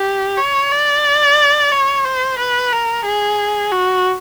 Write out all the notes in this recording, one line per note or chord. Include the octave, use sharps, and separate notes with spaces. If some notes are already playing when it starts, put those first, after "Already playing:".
Already playing: G4
C#5
D5
C#5
C5
B4
A#4
G#4
F#4